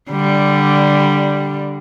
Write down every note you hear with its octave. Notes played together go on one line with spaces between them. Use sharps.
D3 G3